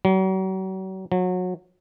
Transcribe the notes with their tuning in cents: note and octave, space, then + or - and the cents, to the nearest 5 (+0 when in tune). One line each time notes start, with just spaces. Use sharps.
F#3 +40
F#3 -25